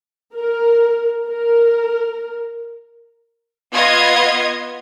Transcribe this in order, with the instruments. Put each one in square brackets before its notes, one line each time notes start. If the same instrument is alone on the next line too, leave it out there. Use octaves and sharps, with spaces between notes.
[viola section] A#4
A#4
[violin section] B3 F4 D#5 G#6 C7